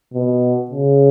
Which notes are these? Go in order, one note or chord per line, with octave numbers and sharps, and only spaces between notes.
B2
C#3